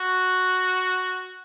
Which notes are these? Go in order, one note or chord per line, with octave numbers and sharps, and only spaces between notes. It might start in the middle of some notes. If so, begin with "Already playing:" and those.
Already playing: F#4